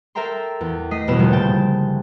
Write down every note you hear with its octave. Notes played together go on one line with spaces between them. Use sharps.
A4 A#4 E5 G5 A#5 C6
E2
A3 D#5 D#6 B6 C7
G1 E2 B2 B3 E7
D#2 D#3 F3 G3 A3
A#2 C#3 G5 A5